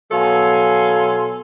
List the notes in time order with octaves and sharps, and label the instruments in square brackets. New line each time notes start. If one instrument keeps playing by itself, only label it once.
[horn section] B2 F#3 A4 F5 G#5 C6